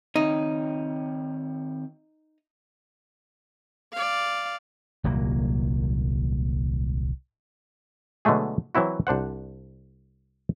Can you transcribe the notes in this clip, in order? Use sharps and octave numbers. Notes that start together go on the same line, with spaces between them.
D#3 C4 D#4 C#5
D5 F5
D#1 C2 F#3 A#3
B2 D3 F#3 G#3 A3 G#4
E3 F#3 C4 E4 F#4
C2 D4 C5 F#5